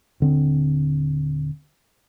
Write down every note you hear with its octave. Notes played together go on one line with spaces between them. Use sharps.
D#1 D3 C4